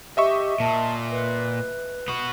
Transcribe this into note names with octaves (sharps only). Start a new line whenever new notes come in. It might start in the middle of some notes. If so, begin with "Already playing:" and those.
G4 D#5 E5 C#6
A#2 A5
B4
B3 F#4